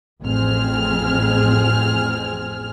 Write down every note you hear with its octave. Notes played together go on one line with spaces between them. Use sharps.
A1 F2 C4 G#4 F6